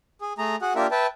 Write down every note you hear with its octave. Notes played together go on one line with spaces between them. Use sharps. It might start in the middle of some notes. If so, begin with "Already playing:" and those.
G#4
A3 G#4 A#5
F#4 G#4 F#5
A#3 D4 F4 G4 A#4 E5
B4 E5 G5 A5